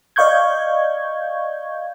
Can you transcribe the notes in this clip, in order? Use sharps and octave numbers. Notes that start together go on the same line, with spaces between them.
D5 D#5 F5 C#6 G6 G#6